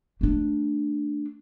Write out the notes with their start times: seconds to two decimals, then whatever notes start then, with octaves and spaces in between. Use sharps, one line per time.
0.21 A3 D4